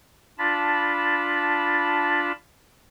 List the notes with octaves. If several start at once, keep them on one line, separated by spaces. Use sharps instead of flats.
D4 F4 A5 B5